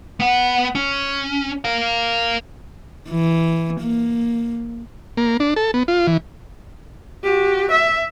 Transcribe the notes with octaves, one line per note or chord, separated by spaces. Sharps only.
B3 F#5
C#4
A#4 F5
E3
A#3
A#3
D4
A4
B3
F4
E3
F#4 G4
E5